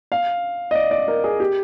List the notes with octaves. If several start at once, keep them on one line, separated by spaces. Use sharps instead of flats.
F5
D#5
D5
D5
A#4
G#4
G4